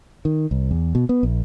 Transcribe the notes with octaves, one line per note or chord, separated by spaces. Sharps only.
D#3
C2
E2
B2
B3
A#1